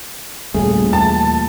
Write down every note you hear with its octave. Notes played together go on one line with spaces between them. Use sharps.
D#2 A#2 C#3 G3 A3 C#4 G#4
D#2 E3 A5